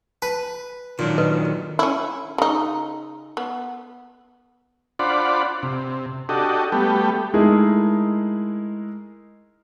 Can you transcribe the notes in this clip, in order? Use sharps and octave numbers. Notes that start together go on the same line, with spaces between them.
B4 A5
A#2 D#3 F#3 D4
A4 B4 D#5
C#4 E4
C#3 D#4
B3
D4 F4 C5 D5 F#5 B5
C3
D4 F#4 G4 A4 D#5
G3 A3 B3 G4
G#3 A3 D#4 E4 G#4 A#4